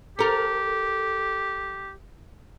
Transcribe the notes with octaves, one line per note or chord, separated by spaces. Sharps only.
G4 A4 A#4